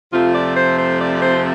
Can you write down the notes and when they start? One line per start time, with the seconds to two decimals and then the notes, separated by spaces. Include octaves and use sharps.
0.12 F2 C3 F3 A3 C4 F4
0.35 D5
0.56 C5
0.78 C5
1.00 D5
1.22 C5